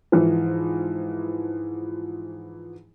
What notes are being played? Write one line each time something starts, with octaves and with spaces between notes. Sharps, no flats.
G#2 E3 F3